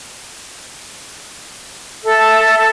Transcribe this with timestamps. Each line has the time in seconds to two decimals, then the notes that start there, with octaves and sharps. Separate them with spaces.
2.05 A4 E5